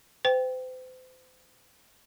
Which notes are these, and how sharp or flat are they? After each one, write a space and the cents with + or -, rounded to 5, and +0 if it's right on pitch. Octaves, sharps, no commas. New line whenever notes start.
C5 -40 G5 +0